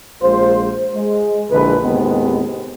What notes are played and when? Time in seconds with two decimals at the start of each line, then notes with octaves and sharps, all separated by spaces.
0.21 A#1 G#3 F4 C5
0.95 G#3
1.50 A#1 D3 E3 G#3 B4
1.83 D#2 A2 C3 G#3 B3 C4